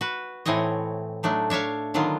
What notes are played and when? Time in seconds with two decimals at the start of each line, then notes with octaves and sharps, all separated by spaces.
0.01 F#4 B4
0.46 A2 E3 C4 C#5 D#5
1.23 F#3 A3 D4 D#4
1.50 D4 C#5 E5 F5
1.94 D3 D#3 F#3 B3 F4